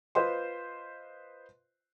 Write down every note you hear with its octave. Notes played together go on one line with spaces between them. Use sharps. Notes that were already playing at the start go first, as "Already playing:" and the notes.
F4 B4 C5 D#5 C6